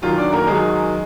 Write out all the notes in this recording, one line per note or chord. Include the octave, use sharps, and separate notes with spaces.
F#2 D#3 F#3 F4
D4 D5
A#3 A#4
F#2 D#3 F#3 G#3 G#4